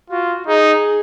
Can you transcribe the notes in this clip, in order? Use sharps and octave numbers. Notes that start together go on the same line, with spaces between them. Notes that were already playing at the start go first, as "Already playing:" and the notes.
F4 F#4
D#4 G#4